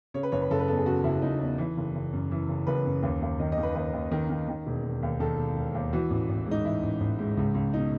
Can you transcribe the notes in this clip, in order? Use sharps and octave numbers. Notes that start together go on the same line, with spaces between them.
C#3 C#5
B4
F#1 C#5
B4
F#1 A4
B4
E2 A4
G#4
C#3 F#4
F#1 E4
F#1 D#4
E2
E3
F#1
F#1
F#2
E3
F#1
F#1 B4
F#2
D#2
D#2
D#3 D#5
D#5
D#3
B4
D#2 B4
D#2
D#3
D#3
D#3
E1
E1
D#2
D#3 A4
E1
E1
D#2
E3 F#4
A1
A1
G#2 D#4
E3 E4
A1
A1
G#2
C#2
C#2
B2 D#4